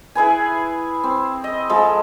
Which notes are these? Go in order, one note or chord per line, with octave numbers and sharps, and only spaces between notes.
E4 G#4 B4 G#5
C4
D#5
F3 G#3 A4 B5